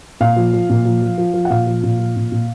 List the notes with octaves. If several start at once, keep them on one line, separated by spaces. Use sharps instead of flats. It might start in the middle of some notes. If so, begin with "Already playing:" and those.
A#2 F5
F3
F3
A#2
F3
F3
F3
F3
F#5
A#2 F5
F3
A#2
F3
A#2
A#2